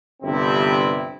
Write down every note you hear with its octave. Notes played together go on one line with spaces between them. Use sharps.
G1 G2 C3 C4 E4